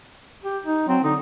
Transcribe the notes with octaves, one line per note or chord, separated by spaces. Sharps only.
G4
D#4
F#3 C4
D3 D#4